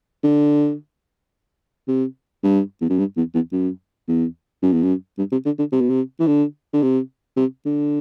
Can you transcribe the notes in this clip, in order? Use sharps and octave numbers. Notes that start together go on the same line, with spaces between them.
D3
C3
G2
E2
F#2
G2
E2
E2
F#2
E2
F#2
E2
F#2
G2
C3
D3
D3
C3
B2
C3
E3
D3
D3
C3
C3
D3